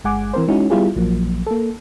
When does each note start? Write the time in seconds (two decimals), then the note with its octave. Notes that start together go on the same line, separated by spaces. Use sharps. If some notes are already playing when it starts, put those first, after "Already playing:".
0.04 G1 G#3 F#5 G#5 D6
0.34 E3 C4 A#4 C5
0.48 G#3 C#4 D#4 E4 F#4
0.70 G3 B3 E4 F4 G4 G#4
0.95 A#1 F3 F#3 A#3
1.47 A#3 A4